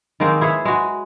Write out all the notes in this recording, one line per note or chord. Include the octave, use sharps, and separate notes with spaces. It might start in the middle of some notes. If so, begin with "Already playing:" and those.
D#3 G#3 A#3 C4
E4 G#4 B4 C#5
G#3 F#4